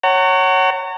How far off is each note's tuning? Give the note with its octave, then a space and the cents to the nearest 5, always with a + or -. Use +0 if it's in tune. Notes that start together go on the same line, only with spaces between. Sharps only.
C#5 -5 F#5 +25 A#5 -35